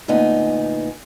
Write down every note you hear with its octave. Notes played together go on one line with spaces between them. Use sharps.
D2 A#2 B3 D#4 G#5